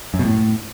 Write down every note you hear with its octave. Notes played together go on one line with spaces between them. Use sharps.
F#2
B2
A2